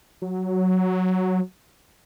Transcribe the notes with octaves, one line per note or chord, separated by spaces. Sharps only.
F#3